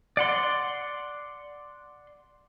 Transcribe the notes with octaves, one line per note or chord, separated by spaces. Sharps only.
D5 F#5 C6